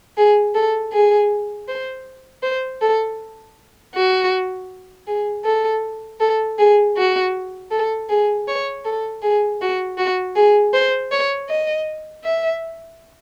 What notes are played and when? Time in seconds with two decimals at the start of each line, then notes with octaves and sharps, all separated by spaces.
0.17 G#4
0.54 A4
0.92 G#4
1.68 C5
2.43 C5
2.82 A4
3.94 F#4
5.07 G#4
5.45 A4
6.20 A4
6.58 G#4
6.97 F#4
7.71 A4
8.09 G#4
8.48 C#5
8.85 A4
9.22 G#4
9.61 F#4
9.98 F#4
10.36 G#4
10.74 C5
11.12 C#5
11.49 D#5
12.24 E5